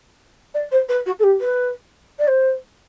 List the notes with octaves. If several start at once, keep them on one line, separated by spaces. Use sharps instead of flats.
D5
C5
B4
F#4
A4
G4
B4
D5
C5